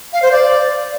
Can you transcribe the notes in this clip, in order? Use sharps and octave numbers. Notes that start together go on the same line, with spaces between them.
F5
C5
D5